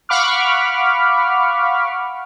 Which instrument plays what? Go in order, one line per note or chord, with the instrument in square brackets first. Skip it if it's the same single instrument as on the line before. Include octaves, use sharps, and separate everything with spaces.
[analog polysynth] F5 F#5 B5 C#6 D6 F6